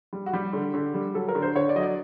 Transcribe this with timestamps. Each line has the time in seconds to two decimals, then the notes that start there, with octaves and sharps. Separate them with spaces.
0.13 G3
0.26 F#4
0.33 G3 G4
0.53 D3
0.74 D3
0.94 G3
1.14 F#3 A4
1.29 A#4
1.35 D3
1.42 C5
1.55 D3 C#5
1.69 D5
1.76 F#3 D#5
1.83 D5